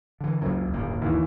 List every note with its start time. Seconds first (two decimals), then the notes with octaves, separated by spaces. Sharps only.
0.21 D3 E3
0.41 F#1 C#2 F#3
0.73 D1 G1 A#3
1.02 D#2 E3